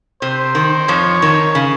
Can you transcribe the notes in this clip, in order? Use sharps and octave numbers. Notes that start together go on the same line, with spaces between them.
C3 C5
D#3
F2 F3 C#5
D#3
C#3